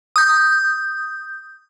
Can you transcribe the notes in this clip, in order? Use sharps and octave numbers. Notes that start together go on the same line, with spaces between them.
D#6 G6